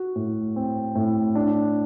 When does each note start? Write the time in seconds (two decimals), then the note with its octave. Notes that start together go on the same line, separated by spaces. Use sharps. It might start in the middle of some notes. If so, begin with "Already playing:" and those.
Already playing: F#4
0.16 A2
0.56 C4
0.95 A2
1.35 D4